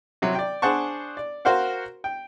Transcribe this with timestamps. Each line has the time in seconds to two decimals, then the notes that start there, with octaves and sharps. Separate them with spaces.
0.22 C3 F#3
0.35 D5 G5
0.62 D4 G#4 C5 F#5 A5 C#6
1.17 D5
1.45 F#4 A#4 C5 F5 F#5
2.04 G5